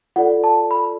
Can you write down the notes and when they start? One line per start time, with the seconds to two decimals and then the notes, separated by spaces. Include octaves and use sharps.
0.16 F4 A4 D5 F#5
0.44 A5
0.71 B5